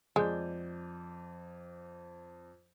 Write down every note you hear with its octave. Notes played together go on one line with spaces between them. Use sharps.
F2 G#3 D5 G6